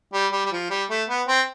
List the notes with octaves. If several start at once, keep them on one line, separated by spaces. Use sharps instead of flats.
G3
G3
G3
F3
G3
A3
B3
C4